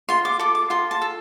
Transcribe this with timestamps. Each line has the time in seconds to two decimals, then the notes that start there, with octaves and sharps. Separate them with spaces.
0.09 F4 C6
0.25 D6
0.39 A4 D6
0.55 D6
0.70 F4 C6
0.91 A5
1.02 A4